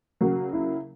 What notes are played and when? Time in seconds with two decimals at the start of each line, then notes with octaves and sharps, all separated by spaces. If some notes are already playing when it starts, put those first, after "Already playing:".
0.21 C#3 F#3 A#3 F#4
0.53 E4